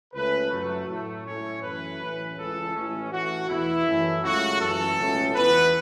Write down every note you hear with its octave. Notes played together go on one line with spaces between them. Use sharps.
C#2 C#3 A3 C#4 B4
F#2 F#3 A3
A2 F#3 A3
A2 A3 C#4 C#5
F#2 E3 A3 C#4 B4
A1 A2 E3 C#4
C#2 C#3 E3 C#4 A4
A1 A2 E3 A3 C#4
A1 A2 A3 F#4
E2 B2 B3 E4
F#2 E3 A3 C#4
C#2 C#3 F#3 A3 F#4
F#2 E3 A3 C#4 A4
C#2 B2 A3 C#4
E2 E3 B3 B4